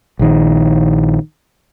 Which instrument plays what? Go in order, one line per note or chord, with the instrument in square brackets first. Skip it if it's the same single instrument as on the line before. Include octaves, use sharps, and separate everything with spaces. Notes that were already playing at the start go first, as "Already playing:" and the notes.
[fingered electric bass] A#1 D#3